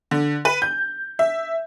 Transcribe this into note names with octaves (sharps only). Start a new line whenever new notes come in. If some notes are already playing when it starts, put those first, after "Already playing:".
D3
B4
G6
E5